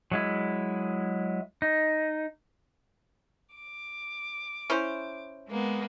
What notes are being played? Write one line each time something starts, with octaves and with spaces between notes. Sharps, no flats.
F#3 G#3 E4
D#4
D6
C#4 E4 C5
G#3 A#3 B3